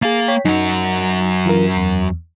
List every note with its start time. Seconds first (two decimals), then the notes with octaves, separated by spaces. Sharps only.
0.02 A#3 G#4 F5 A6
0.28 C#5 G5 B6
0.45 F#2 D#4 F#4
1.46 E3 F4 A#4
1.77 E2